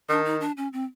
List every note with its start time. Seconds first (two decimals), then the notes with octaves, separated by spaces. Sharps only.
0.09 D#3 D4
0.25 D#4
0.41 D4
0.57 C#4
0.73 C4